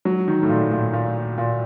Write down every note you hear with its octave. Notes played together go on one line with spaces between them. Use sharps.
F#3
D#3
A2
A#2
A#2
A#2
A#2